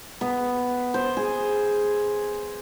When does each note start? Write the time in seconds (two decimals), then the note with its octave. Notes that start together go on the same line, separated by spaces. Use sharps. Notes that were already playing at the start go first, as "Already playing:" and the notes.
0.21 B3
0.94 C5
1.17 G#4